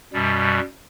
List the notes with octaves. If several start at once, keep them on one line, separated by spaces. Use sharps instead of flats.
F#2 B2 G3